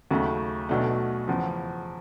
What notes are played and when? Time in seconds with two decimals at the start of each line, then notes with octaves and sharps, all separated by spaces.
0.11 D#2 C#3 F#3 A3
0.69 B1 B2 F#3 A3 D4
1.27 E2 C#3 F3